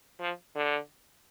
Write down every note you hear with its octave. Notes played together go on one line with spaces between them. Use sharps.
F3
D3